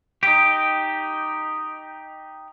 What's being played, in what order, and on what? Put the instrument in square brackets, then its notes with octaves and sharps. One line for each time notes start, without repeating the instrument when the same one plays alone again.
[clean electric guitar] D#4 G4